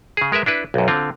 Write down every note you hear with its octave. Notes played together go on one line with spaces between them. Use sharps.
C#3 G#4
G#3 A#4 B4 E5
D4 E4 B4
B1 F#2
D3 C4 F4